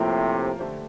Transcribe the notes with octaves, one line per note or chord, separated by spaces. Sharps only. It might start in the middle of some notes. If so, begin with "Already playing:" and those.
Already playing: A2 C3 F3 A#3 F4 A#4
D3 A3 D4 G4 C5